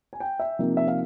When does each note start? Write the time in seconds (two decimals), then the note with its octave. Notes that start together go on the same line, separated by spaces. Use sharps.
0.13 G#5
0.20 G5
0.39 E5
0.59 C3 F3 A#3 D#4
0.77 E5
0.88 F5